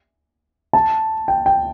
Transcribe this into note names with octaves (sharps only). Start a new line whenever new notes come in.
A5
G5
G5